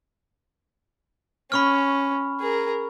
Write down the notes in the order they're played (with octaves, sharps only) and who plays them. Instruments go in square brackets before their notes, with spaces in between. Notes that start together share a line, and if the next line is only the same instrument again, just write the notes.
[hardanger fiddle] C#4 [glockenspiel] B5 C#6 F6
[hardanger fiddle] G#4 A#4